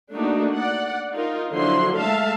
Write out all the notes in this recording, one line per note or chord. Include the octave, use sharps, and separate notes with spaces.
A3 A#3 D4 D#4 F#4
D5 F#5
D#4 F4 A#4
D3 F3 F#3 E4 C6
G#3 A3 E5 F5 A5